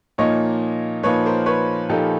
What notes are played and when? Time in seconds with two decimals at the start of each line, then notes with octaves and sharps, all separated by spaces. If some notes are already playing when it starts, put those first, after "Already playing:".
0.18 A#2 F3 A#3 D#4 C#5 D#5
1.03 A#2 F3 A#3 D#4 B4 C#5
1.26 A#4 C5
1.46 B4 C#5
1.89 A#2 F3 A#3 D#4 G4 A4